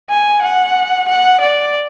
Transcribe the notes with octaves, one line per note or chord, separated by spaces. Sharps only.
G#5
F#5
F#5
D5